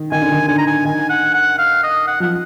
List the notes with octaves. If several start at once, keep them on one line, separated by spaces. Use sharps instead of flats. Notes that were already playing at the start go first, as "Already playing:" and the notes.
Already playing: D#3
D#3 G#5
D3
D#3
D3 G#5
A#5
G#5
D#3 G#5
F#5
F#5
F5
D#5
F#5
F3 F#5